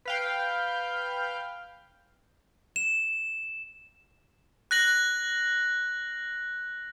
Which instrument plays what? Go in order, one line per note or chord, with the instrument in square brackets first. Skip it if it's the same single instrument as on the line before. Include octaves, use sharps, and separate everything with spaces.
[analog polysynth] B4 F5 G5
[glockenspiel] E7
[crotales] F#6 A#6 F#7